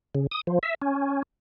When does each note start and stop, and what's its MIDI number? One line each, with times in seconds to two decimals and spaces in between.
0.15 0.27 49
0.31 0.41 87
0.47 0.59 53
0.63 0.75 76
0.82 1.22 61